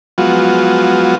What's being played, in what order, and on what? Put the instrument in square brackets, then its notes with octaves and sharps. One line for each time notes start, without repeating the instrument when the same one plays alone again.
[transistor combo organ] F3 F#3 G#3 B3 F4 F#4